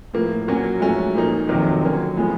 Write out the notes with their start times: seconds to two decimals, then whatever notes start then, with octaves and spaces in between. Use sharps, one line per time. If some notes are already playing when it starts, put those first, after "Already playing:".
0.13 A2 F3 A#3
0.47 A#2 F#3 A#3 C#4 F#4
0.80 G#2 F3 A3 C#4 F#4
1.14 A#2 F3 A#3 D#4
1.48 F2 C3 D#3 F#3
1.81 D3 F#3 A#3 C#4
2.16 A2 F3 G#3 B3